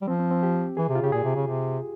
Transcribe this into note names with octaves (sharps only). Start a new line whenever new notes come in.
G3
F3 C4
C4
C4
G4
E3 G#4
C3
F4
C#3 G4
A#2 G#4
C3
C#3
C3